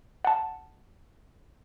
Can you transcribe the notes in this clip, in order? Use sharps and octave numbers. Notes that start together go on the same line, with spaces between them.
F#5 A5